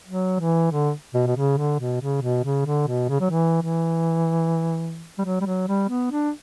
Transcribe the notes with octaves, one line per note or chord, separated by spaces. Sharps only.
F#3
E3
D3
B2
B2
C#3
D3
B2
C#3
B2
C#3
D3
B2
C#3
F#3
E3
E3
G3
F#3
G3
F#3
G3
B3
D4